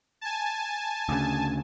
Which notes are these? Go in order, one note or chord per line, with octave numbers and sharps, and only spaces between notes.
G#5 A5
D2 C#3